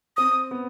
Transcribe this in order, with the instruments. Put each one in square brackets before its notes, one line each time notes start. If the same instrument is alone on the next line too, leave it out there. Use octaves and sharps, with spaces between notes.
[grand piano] C4 [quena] D#6
[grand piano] B3